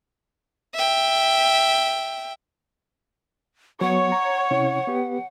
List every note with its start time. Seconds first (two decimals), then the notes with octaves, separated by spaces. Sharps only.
0.74 E5 G5
3.81 F#3 B3 C#5 F#5
4.12 A#5
4.51 C3 C#4 E4
4.87 B3 G4 B4